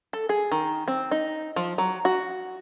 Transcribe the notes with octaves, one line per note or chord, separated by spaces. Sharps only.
A4
G#4
D#3
C4
D#4
F3
F#3
F#4